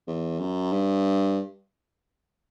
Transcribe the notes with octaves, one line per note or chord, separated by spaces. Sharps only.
E2
F#2
G2